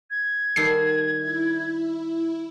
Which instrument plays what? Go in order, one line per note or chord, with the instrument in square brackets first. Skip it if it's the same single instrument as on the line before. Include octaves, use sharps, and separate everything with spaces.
[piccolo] G#6
[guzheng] D#3 G3 A4 [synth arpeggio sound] C7
[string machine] E4